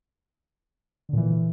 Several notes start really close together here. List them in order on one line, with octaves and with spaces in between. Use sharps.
D3 A#2 E3